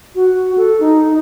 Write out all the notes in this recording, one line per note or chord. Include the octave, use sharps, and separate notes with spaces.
F#4
A4
D#4